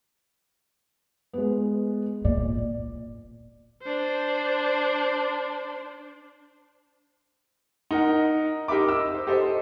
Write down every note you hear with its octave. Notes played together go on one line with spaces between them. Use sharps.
G#3 B3
A#2 D5
D4 C5
D#4 A#4 F#5
D#4 G4 A#4 E5 B5 D6
E6
C5
G4 A4 C5 D#5 E5